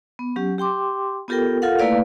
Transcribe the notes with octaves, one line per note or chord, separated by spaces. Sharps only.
B3
F#3 C#4 G4
G4 G5 C6 D6
B3 F4 G4 A4 A#4 G5
F4 A4 A#4 F5 F#5
A3 A#3 E4 B4 D5 F5